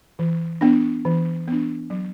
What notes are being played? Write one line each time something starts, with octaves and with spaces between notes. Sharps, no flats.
E3
B3 D4
E3
B3 D4
F#3